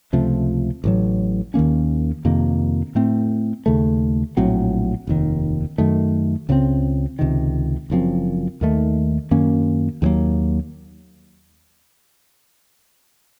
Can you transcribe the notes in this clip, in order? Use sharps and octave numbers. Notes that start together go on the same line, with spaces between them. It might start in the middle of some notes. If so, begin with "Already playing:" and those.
C#2 C3 F3 A3
A1 A2 F#3
D#2 D#3 A#3 C#4
F2 C3 D#3 A#3
A2 A3 C4
D#2 C#3 A3
A#1 A2 F#3 C4
F1 D#2 D#3
F#2 D#3 A3
C#2 C#3 A3 C4
C#2 C3 D#3
F#1 F#2 F3 C4
D#2 D#3 A3
F#2 D#3 A#3 C#4
D#2 D#3 F#3 A#3